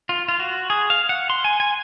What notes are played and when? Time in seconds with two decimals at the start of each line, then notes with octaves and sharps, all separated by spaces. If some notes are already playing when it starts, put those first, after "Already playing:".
0.09 F4
0.28 F4
0.39 F#4
0.70 G#4
0.90 F5
1.09 F#5
1.30 C6
1.44 G#5
1.60 G#5